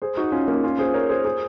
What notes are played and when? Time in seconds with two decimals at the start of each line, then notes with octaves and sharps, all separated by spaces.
0.02 G#4 C5
0.17 D#4 F#4
0.32 C#4 F4
0.48 A#3 C#4
0.64 C#4 F4
0.79 G#4 C5
0.94 A#4 C#5
1.09 G#4 C5
1.25 G#4 C5